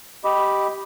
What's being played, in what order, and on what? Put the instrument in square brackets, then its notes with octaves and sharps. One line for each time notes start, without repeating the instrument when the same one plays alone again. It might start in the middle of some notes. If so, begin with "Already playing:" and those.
[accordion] G4 D#5 B5 D6